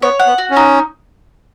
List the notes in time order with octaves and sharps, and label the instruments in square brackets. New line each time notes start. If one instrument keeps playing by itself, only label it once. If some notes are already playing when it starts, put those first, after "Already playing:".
[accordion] B3 [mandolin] C#5
[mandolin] F#5
[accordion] B3
[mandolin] F#4
[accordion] C#4
[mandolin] D#4